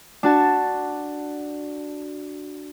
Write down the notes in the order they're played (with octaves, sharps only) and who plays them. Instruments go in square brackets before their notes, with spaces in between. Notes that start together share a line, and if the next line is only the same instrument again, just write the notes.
[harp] D4 F#4 A5